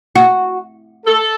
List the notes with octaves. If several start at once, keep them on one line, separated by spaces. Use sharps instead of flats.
F#4
A4